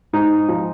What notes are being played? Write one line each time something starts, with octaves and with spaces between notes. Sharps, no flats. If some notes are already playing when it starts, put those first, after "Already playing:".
G#2 D#4
F3